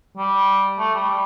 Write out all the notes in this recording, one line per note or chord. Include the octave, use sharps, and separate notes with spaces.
G3
A3
G3
G3